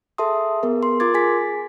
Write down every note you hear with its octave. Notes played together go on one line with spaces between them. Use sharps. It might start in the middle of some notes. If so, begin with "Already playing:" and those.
G#4 A4 E5 A5 C6 D#6
B3 G#4 A#4
C6
F4 A#4 C6 D6 G#6 A6
G#4 G#5 B6